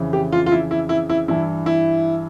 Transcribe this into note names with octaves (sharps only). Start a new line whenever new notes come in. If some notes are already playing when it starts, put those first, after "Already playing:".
Already playing: F2 C#3 E3
G4
F4
F4
E4
E4
E4
E4
G2 E3 E4
E4